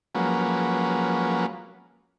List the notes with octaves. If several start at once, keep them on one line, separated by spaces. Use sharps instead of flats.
F3 F#3 G#3 A#3 C#4 B4